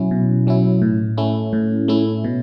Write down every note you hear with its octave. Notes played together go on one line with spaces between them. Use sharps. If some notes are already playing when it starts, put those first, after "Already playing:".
Already playing: B2 F#3 C#4 E4
B2
F#3 C#4 E4
A2
A3 C#4 E4
A2
A3 C#4 E4
B2